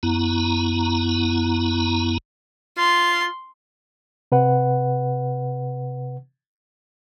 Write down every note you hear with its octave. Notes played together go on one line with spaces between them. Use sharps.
F#2 B3 E4 A#5
F4 C6
C3 B4 F#5